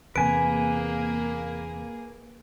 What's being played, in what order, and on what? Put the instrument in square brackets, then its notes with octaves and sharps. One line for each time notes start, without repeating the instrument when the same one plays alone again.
[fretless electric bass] E2 C3 [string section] A#3 G#4 [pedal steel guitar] B4 G#5 [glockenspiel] D7